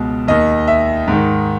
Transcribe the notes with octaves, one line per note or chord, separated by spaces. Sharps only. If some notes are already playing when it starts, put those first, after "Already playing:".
Already playing: C#2 B2
D#2 D#3 D#5
E5
G#2 D#3